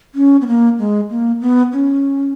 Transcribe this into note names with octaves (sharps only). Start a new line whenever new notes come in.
C#4
B3
A#3
G#3
A#3
B3
C#4